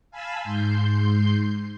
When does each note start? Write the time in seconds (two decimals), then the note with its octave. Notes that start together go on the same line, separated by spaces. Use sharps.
0.11 F5 G#5 A5 B5 E6
0.42 G#2 C6 G6